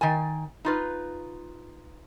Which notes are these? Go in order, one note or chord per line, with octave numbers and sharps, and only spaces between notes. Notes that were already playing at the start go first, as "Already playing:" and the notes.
D#3 G5 G#5
D#4 F4 B4